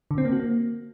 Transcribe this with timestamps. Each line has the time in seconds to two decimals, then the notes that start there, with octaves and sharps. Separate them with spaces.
0.11 D3
0.18 C4
0.25 A#3
0.32 F#4
0.40 A#3